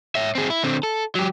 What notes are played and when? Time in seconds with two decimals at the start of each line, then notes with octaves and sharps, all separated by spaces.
0.15 C#5 E5
0.35 C4 G#4
0.50 E4
0.64 D3 C4
0.83 A4
1.15 F#3 G4